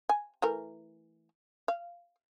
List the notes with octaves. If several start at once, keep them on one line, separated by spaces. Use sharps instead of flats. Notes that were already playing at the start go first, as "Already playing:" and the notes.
G#5
E3 A3 A#4
F5